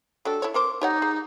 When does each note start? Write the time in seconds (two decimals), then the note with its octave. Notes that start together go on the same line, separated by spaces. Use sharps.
0.25 F#3 D4 G4 A4
0.42 E4 C#5
0.54 C4 A#4 C5 D6
0.81 D#4 G4 C#5 F#5
1.02 G#4